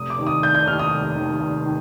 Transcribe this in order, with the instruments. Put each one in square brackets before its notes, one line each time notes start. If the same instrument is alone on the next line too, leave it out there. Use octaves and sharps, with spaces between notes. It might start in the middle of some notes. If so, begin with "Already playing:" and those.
Already playing: [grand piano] F1 D#6
D6
D#2 D#3
D#6
F1 G6
G6
D#2 D#3 F6
D#6
F1
D#2 D#3
F1
D#3